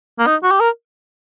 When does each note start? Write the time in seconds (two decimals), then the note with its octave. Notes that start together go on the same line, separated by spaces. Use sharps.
0.19 A#3
0.27 D#4
0.43 F#4
0.51 G4
0.60 A#4